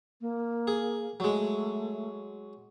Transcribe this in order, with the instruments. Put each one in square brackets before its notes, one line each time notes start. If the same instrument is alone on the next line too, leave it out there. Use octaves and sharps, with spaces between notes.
[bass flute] A#3
[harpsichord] G#4
[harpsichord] F#3 G#3 [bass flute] A3